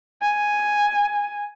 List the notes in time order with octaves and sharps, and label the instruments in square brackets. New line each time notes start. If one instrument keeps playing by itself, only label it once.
[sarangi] G#5